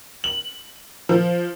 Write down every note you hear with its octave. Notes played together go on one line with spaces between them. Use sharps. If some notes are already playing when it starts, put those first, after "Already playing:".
F#7
F3